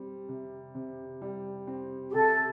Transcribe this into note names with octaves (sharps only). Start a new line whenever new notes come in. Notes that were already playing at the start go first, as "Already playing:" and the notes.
Already playing: G3 C4
C3
C3
G3
C4
G4
C3 A4